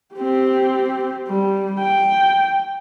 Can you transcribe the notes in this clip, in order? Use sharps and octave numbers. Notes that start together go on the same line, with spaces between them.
C4 G4
G3
G5